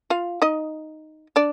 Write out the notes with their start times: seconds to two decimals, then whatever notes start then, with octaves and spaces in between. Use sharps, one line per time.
0.10 F4 F5
0.42 D#4 D#5
1.36 D4 D5